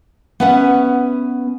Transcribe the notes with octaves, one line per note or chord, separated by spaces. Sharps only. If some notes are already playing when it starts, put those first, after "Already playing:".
B3 C#4 B4 E5 F#5